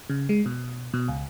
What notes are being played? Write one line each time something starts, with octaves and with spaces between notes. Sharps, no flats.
C#3
G#3
B2
B2
C#2